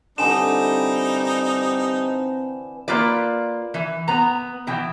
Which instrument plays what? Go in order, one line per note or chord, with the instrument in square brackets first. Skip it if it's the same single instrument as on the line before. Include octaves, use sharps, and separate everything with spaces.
[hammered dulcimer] D3 E3 [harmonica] G3 D#4 [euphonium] C4 [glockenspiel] G#5 E7
[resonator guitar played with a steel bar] A#3 F4 B4 D5
E3
B3 A#5
B2 E3 G5